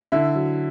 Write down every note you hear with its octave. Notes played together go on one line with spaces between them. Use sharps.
D3 E4 E5
F#3